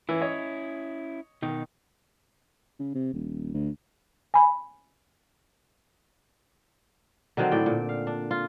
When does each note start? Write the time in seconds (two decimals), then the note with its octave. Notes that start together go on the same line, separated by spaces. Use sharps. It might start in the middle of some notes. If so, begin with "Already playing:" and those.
0.09 E3 C#4 E4
0.22 C#5 D#5
1.42 B2 D#3 D#4
2.80 C#3
2.95 C3
3.14 D#1
3.54 D2
4.34 G#5 B5
7.37 D3 D#3 F#3 C4
7.51 A2 D5 G5
7.66 A#2
7.89 F5
8.07 D4
8.31 F4